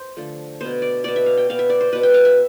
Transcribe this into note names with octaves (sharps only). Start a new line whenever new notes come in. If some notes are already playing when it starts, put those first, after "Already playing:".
Already playing: C5
D3 F3 A3
B2 B3 C5
D5
B2 B3 D5
E5
F5
G5
B2 B3 F5
E5
D5
C5
B2 B3 B4
G5
F5
E5